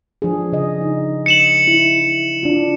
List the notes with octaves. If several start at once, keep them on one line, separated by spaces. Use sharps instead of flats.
F3 D4 G#4
C#3 D#5
D#4
C#7 E7 F#7
E4
D4 F4